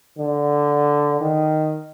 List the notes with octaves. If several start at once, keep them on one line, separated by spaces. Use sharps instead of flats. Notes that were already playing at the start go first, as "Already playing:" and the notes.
D3
D#3